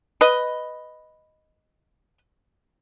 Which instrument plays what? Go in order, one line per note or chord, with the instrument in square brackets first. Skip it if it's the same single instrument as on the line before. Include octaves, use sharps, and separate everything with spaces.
[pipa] B4 D#5